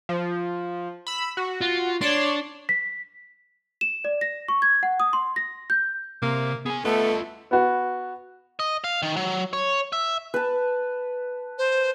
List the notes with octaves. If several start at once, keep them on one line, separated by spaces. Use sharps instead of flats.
F3
B5 E6
F#4
F4
D4 C#5 D5 C6
B6
E7
D5
A#6
C#6
G#6
F#5
D#6
C6
A#6
G6
C3 A#3
B3 G#4 G#5
A3 B3 F4 D#5
B3 F#4
D#5
F5
D#3
F#3
C#5
E5
B4 A5
C5